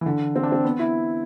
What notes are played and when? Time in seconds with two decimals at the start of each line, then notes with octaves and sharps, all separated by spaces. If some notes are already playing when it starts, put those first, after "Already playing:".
0.01 E3
0.06 D3
0.36 C4
0.43 D4
0.52 C4
0.64 B3
0.79 E4